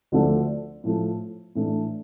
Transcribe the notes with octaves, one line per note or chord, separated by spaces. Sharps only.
D2 D3 F3 A3 D4
A2 F3 A3
A2 E3 A3 D4